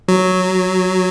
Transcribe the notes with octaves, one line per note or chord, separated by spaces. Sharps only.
F#3